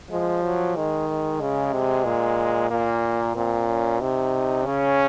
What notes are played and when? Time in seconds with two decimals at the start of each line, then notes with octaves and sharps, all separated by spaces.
0.10 F3 G#3
0.44 F#3
0.76 D#3 G#3
1.09 G#3
1.41 C#3
1.73 C3
2.05 A#2
2.70 A#2 A#3
3.36 A#2 C4
3.68 C#4
4.00 C3 D#4
4.65 C#3 C#4